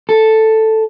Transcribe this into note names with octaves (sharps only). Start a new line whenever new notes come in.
A4